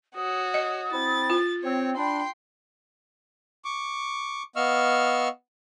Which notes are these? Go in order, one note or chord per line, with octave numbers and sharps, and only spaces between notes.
F#4 C#5 D#6
D#5
C4 E4 A6
F4
C4 C#5
D4 G5 B5 C6
C#6 D6
B3 D#5 F5 C#6 E6 F6